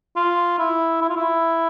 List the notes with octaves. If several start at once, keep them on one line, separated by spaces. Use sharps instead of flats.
F4
E4
E4
F4
E4